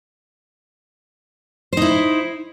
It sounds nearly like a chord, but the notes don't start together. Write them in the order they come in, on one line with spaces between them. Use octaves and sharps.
C5 D#4 E4